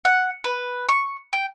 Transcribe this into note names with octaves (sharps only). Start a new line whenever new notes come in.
F#5
B4
C#6
G5